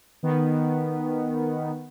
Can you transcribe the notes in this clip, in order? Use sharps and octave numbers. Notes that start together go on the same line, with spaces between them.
D#3 B3